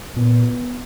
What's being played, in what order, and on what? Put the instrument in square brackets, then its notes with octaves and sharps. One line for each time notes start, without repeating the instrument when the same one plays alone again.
[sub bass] A#2 [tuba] B3